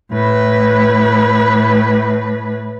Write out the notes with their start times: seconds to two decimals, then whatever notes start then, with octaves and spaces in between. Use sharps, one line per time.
0.12 A2 B4